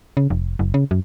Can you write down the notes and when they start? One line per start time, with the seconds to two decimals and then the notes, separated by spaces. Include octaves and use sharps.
0.17 C#3
0.30 F1
0.59 F#1
0.74 C#3
0.91 F#2